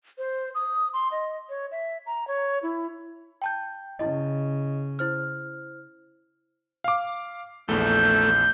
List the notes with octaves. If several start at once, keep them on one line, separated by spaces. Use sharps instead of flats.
C5
D#6
C6
D#5
C#5
E5
A#5
C#5
E4
G5 A5 G6
C#3 E4 D#5
E4 C5 F6
F5 D6
A#1 E2 A3 G6